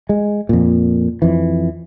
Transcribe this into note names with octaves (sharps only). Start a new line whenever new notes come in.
G#3
F2 A#2
F2 E3